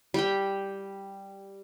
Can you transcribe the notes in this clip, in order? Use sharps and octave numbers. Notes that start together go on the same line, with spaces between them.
G3 G4 G5